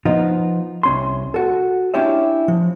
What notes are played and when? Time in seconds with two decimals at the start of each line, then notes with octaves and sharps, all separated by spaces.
0.05 F3 B3 D#4 F4
0.83 C2 C#4 C6
1.34 F#4 A4
1.94 C#4 D4 E4 G4 C#5 E5
2.48 F3